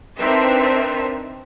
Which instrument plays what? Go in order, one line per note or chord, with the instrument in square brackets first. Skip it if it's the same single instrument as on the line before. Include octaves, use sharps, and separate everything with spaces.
[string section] C4 D4 D#4 A#4 B4 E5